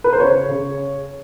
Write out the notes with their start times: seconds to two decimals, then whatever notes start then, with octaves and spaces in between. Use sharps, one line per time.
0.04 B4
0.13 C5
0.20 C#3 C#5
0.49 C#3